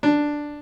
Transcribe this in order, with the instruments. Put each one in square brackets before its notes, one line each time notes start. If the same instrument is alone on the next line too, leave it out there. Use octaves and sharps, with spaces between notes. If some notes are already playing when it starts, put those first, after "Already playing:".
[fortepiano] D4